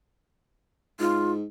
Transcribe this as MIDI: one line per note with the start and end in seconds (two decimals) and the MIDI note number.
1.00 1.44 44
1.00 1.32 65